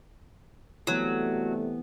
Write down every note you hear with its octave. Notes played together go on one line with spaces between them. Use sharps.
C3 E3 F#3 G3 A3 B3